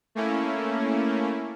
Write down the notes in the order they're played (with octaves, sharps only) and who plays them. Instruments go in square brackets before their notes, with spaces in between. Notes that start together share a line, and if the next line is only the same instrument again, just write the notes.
[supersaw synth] A3 A#3 C#4 E4